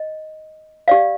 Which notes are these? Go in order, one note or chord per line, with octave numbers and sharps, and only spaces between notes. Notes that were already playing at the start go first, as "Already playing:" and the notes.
Already playing: D#5
G4 D5 F5